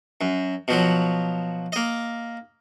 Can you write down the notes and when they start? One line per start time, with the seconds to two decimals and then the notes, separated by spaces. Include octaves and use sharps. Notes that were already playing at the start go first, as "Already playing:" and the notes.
0.21 F#2
0.68 B2 F3 F#3
1.72 A#3 D#5